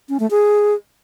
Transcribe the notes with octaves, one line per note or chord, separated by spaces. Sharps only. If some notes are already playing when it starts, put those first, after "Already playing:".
C#4
A3
G#4